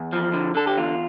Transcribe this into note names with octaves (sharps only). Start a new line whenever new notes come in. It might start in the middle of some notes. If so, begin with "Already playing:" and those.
Already playing: E2
F3
D3
D3 A4
G4
E2 F4